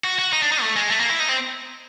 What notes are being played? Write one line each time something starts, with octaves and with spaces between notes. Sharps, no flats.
F#4
F#4
D#4
D4
D#4
A3
G#3
A3
A#3
E4
D#4
C4